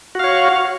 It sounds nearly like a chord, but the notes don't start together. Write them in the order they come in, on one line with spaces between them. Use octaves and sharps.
F#4 F5 C#5